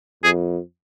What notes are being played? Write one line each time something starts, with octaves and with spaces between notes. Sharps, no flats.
F2 G#4